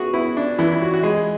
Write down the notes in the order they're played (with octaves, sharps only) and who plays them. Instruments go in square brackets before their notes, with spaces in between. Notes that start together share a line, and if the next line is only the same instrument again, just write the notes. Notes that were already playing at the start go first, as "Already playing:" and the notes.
Already playing: [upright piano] B3 [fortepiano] F#4 G#4
[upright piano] B3 [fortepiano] E4
[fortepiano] D4
[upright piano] E3 [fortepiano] E4
[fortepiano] E4
F#4
F#4
[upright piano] G#3 [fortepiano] G#4